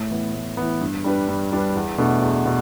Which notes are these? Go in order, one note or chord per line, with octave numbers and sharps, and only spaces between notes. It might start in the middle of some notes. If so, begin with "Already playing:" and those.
Already playing: A2
E3 B3
A2
E3 B3
G2
G3 D4 B4
G2
G3 D4 B4
E2
B2 A3 D4
E2
B2